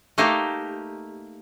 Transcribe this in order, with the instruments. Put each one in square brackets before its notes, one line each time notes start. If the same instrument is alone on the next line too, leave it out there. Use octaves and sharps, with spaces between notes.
[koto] A3 A#3 D#4 G4